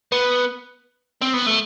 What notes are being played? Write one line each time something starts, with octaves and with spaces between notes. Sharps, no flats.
B3
C4
B3
A3